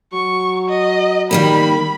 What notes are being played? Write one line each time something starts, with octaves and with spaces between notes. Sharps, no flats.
F#3 C#6
D#5
D#3 G3 A#3 B5